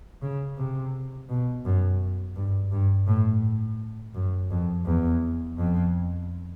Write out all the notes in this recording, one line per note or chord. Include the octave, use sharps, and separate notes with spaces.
C#3
C3
B2
F#2
G2
G2
A2
F#2
F2
E2
F2